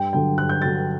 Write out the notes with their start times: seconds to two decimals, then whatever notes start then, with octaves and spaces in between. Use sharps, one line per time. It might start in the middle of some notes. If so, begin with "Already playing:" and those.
Already playing: G2 G5
0.13 D3 F#3 G5
0.37 G2 F#6
0.49 G6
0.62 D3 F#3 A6